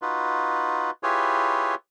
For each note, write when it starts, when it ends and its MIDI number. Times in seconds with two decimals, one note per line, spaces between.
0.02 0.91 63
0.02 0.91 65
0.02 0.91 66
0.02 0.91 71
1.03 1.75 64
1.03 1.75 65
1.03 1.75 67
1.03 1.75 68
1.03 1.75 71
1.03 1.75 73